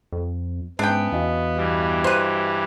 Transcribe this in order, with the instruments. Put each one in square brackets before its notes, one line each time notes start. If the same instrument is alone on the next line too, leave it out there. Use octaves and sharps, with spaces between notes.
[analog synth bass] F2
[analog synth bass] G#2 [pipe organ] B3 [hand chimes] C#4 E5 G#5 [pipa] D4 G5
[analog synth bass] E2 [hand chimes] F#4 D#5 F5
[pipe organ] G2 E3 G3
[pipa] B4 C5